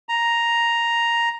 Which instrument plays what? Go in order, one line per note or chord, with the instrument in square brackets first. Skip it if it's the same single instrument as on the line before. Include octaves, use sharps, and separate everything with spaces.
[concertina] A#5